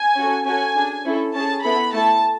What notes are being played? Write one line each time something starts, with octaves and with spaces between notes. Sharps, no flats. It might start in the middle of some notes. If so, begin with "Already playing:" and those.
Already playing: G#5
C#4 F#4 A4
C#4 F#4 A4 G#5
D4 G#4
C#4 E4 A4
C#4 G#4 A5
B3 E4 A4 B5
A3 E4 A4 A5